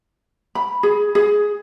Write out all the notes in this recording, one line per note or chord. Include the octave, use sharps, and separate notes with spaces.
B5
G#4
G#4